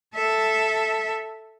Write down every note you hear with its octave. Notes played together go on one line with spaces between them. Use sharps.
A4 E5